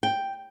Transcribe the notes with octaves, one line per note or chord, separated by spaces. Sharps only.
G5